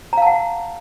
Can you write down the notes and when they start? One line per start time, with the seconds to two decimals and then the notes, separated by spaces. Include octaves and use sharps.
0.13 A#5
0.17 F5
0.22 A5
0.27 F#5